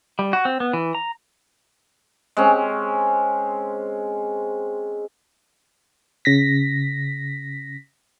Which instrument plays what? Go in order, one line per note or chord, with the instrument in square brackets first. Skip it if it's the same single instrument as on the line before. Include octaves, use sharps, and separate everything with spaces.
[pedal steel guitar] G3
F#4
C4
B3
E3
A#5
[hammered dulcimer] G#3 C4 C#4
[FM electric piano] C#3 A#6 B6